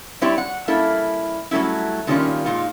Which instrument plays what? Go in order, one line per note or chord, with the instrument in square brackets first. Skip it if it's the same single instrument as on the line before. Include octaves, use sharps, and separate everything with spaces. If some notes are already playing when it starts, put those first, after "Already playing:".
[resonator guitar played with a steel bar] G3 C4 E4 G4 C#5 D5
F#5
G3 A#3 C#4 E4 A4
F#3 G3 A3 C#4 E4
A#2 D#3 G3 A3 C#4 F4
A#2 G#3 D#4 F4